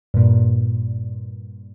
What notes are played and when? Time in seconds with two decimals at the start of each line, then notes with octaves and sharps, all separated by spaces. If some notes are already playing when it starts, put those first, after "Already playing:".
0.14 G2 A#2